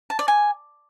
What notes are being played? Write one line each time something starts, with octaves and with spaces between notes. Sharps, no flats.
A5
D5
G#5